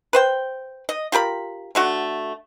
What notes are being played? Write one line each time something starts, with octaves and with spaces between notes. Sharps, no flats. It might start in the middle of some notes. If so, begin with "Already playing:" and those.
B4 C5 G5
D#5
F4 G4 A#4 B5
D3 A3 F#4